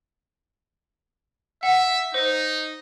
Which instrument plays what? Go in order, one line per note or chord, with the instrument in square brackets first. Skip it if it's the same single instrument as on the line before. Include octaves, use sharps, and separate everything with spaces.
[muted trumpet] E5 [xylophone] F#5
[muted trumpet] D#4 [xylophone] C5